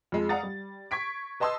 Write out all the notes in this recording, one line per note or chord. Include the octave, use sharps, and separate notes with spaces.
F2 G#3
D5 F5 F#5 A#5 D#6 A6
G3
C#6 G#6 B6 D7
B4 D#5 A5 C6 D#6 E6